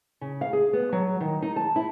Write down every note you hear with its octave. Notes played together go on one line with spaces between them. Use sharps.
C#3
F5
G#4
B3
F#3
D#3
D#4
A5
E4